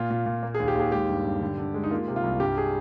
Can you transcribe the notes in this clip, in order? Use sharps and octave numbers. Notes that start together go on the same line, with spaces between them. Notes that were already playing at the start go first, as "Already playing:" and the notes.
Already playing: A#2 F4
A#2
A#2
A#3
G#4
D#2
G4
D#2 G#4
G#3 G4
G2
G2
D3
D3
G#3
D#4
A#3 F4
C3
F4
C2
G2 G4
G#4